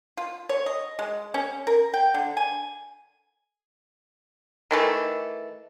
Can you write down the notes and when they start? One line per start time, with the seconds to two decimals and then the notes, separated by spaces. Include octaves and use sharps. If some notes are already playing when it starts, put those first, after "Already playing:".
0.17 F4
0.49 C#5
0.66 D#5
0.99 G#3
1.34 C#4
1.67 A#4
1.94 G5
2.14 D3
2.37 G#5
4.71 D#3 E3 A3 A4